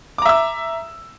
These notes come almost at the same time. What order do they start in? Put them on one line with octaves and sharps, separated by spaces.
D6 A#5 E5 E6